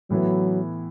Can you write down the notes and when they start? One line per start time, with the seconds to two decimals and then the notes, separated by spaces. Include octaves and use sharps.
0.10 A2 E3 F#3 B3 E4